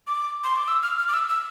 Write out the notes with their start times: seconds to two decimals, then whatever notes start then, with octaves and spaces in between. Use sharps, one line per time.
0.07 D6
0.44 C6
0.56 D6
0.68 E6
0.83 F6
0.99 F6
1.08 D6
1.14 E6
1.29 E6